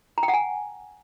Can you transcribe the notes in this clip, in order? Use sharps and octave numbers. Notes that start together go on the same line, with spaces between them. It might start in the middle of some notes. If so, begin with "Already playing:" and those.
A#5
G5
F#5
G#5